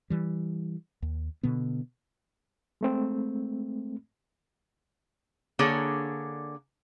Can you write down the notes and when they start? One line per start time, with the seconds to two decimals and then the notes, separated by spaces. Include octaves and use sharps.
0.10 E3 G3
1.02 D#2
1.43 B2 D3 B3
2.81 G#3 A3 C4
5.59 D3 A#3 D4 G#4 C#5